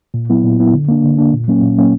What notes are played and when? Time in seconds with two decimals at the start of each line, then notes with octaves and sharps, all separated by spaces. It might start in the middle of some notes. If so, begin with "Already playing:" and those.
0.14 A#2
0.30 F#3 B3 E4
0.44 A#2
0.59 F#3 B3 E4
0.73 D3
0.88 A#3 D4
1.04 D3
1.18 A#3 D4
1.33 A#2
1.48 F#3 A#3 C#4
1.62 A#2
1.78 F#3 A#3 C#4